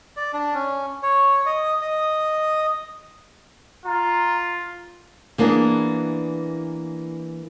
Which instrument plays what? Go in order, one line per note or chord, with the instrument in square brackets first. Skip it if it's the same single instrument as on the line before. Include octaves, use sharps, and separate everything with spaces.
[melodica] D5
D4
C#4
C#5
D#5
D#5
[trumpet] F4 [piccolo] A#5
[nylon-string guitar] E3 A#3 B3 D4 G#4